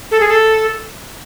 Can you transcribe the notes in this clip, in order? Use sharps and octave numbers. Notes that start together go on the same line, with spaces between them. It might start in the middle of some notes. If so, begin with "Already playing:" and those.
A4
G#4
A4